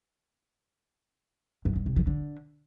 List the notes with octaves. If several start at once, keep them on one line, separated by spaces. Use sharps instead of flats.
F#2
G2
C3
F3
D3